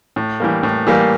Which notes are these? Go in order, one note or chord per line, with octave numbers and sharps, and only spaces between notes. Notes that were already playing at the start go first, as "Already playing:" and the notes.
A2
E3 G3 A#3
A2
E3 G3 A#3